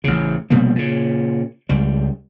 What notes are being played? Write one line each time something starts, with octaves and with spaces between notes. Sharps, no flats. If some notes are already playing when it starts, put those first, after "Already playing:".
A1 C#3
F1 B2 G3 A#3
A#2 C#3
C#2 G3